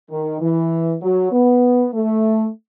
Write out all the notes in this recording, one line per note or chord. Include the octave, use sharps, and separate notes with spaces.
D#3
E3
F#3
B3
A3